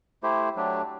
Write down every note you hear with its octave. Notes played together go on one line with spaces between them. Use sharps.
A3 E4 G4 C5
F#3 A3 D4 G4